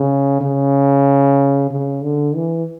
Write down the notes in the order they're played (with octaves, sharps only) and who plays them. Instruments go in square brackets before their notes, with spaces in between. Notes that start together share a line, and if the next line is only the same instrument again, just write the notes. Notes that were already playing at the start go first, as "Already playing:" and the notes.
Already playing: [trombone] C#3
C#3
C#3
D3
E3